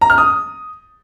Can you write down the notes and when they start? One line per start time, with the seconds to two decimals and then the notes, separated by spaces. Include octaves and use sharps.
0.01 A#5
0.10 F6
0.18 D#6